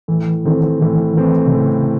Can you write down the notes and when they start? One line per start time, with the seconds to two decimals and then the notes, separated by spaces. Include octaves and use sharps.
0.08 A2 E3
0.45 D#3 E3 A3 C4
0.81 A2 E3
1.17 E3 A3 C4
1.46 C3
1.54 A2 C#3